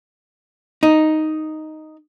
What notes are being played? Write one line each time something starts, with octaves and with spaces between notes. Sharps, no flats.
D#4